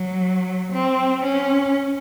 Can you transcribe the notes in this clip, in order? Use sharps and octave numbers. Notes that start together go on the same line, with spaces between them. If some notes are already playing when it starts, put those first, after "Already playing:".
Already playing: F#3
C4
C#4